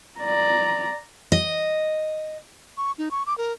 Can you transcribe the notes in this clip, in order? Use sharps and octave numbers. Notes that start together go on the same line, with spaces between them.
D5 A#5
D#5
C#6
D#4
C#6
D6
A#4